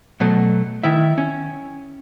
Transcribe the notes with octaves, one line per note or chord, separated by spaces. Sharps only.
B2 F#3 A3
D#3 E4 E5
C#4